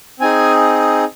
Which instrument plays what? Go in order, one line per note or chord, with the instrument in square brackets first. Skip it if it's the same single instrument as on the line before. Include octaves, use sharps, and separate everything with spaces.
[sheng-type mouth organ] C4 D#4 G#4 G#5